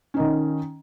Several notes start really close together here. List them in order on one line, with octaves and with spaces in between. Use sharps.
C#4 D#4 D#3